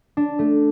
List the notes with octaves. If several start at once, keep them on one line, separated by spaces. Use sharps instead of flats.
D4
A3